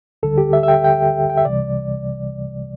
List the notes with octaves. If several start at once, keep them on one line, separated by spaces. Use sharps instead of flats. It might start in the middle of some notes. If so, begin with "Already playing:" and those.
D2 D3 G3 A4
G4
E5
E5
G5
G5
G5
E5
C2 C3 E3 G3 D5